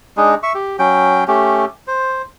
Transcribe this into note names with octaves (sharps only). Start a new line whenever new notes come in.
G#3 D4 D#4 G#4
E5 C#6
G4
F#3 C#4 G5
A3 C#4 G4
C5